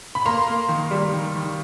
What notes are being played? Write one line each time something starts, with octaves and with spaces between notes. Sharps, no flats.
B5
A#3 A#5 C6
A#3
D#3
G3
D#3
D#3